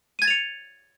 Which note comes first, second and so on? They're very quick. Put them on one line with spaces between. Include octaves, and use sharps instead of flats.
D#7 G#6 A6 F7 C#7